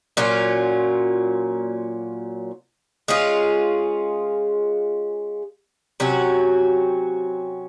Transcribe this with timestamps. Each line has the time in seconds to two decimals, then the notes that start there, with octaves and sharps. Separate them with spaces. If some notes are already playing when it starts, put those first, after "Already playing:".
0.17 A#2 F#3 C#4 F4
3.08 G#3 C#4 F4 G#4
6.00 C3 F#3 C#4 F#4